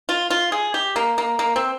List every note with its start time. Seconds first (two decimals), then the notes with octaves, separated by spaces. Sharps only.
0.09 F4
0.30 F4
0.52 G#4
0.74 G4
0.96 A#3
1.18 A#3
1.39 A#3
1.56 C4